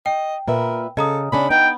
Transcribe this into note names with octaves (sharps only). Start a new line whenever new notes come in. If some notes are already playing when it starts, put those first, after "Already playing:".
D#5 G5
A#2 A#4 B4 E5
C#3 A4 D#5 A#5 D#6
C#3 C#4 D4 B5
B3 D#4 G5